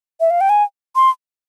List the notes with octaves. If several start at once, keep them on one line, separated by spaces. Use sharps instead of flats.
E5
F5
G5
G#5
C6